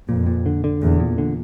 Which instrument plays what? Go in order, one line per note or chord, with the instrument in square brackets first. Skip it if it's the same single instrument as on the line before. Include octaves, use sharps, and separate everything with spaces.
[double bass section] F2 [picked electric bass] A#2
[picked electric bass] A#2
D3
D3
[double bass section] E2 [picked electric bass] A#2
[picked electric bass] A#2
D3